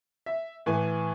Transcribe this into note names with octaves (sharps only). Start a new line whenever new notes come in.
E5
A2 E3 G#5